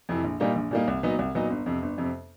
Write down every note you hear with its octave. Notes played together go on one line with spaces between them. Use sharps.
F2 C3 E3
A#1
A#2 G3 A#3 D#4
A#1
A#2 G3 A#3 D#4
C2
A#2 F#3 B3 D#4
C2
A#2 F#3 B3 D#4
G1
F2 C3
G1
F2 C3